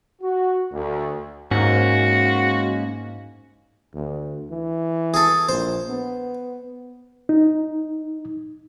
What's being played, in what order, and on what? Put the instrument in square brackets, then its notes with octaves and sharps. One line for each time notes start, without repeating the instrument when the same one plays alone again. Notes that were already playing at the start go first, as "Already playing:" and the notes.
[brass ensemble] F#4
D2
[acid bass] G#2 [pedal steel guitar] G#3 A#3 C#4 [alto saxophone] F#4
[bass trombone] D2
E3
[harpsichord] G#4 A4
[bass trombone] A#1 [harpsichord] C5
[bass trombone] B3
[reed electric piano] D#4